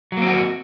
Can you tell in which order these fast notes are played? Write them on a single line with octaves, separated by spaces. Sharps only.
F#3 A#3 C4 F#4